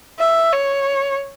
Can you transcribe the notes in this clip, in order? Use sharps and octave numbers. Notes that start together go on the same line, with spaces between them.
E5
C#5